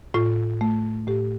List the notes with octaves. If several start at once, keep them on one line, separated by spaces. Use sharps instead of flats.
A2 F4
A3
A2 G4